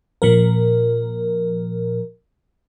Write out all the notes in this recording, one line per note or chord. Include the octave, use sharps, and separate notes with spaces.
A#2 F3 A#4